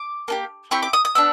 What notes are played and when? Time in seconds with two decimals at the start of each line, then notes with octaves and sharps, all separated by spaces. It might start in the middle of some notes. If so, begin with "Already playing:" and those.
Already playing: D6
0.28 A#3 D4 G4
0.71 C4 E4 G4 C#6
0.83 D6
0.93 D#6
1.05 D#6
1.15 B3 D4 E6